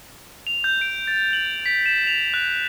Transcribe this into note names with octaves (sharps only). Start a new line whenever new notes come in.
F7
G6
D7
A6
F#7
B6
E7
F7
F#6